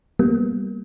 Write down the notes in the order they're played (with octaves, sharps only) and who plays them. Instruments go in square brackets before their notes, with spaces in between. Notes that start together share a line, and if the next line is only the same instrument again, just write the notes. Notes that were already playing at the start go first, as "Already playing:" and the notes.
[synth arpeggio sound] G3 A#3 B3